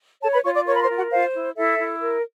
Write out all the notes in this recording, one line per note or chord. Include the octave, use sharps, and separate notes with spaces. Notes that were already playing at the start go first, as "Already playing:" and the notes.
A4 C#5 A5
B4 B5
F4 C#5 C#6
D5 D6
A#4 C#5 C#6
B5
C5 C6
F4
F#4 F#5
F4 C5 F5
E4
E4 A4 E5
E4
A#4